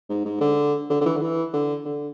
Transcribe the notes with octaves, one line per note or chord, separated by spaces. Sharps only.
G#2
G#2
D3
D3
D3
E3
D3
E3
D3
D3